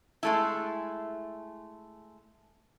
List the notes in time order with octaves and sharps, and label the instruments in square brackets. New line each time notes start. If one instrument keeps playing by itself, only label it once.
[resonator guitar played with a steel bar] G#3 A3 E4